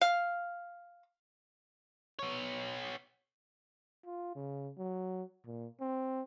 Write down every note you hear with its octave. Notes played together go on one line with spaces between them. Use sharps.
F5
B3 C#5
F4
C#3
F#3
A#2
C4